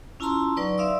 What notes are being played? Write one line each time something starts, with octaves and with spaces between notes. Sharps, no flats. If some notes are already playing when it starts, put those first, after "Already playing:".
C#4 E4 F4 A5 A#5 C6
F#3 D#4 B4 D5 C#6
D5 E5 F5 C6 D#6 E6